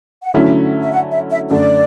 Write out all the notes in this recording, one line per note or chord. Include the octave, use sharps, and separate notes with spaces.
F#5
D3 F#3 A3 C#4 E4 E5
E5
F#5
E5
E5
F#2 D3 A3 D5